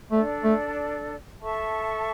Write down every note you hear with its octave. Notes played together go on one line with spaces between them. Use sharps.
A3 D4 A4 D5
A3
A4 E5 A5 C#6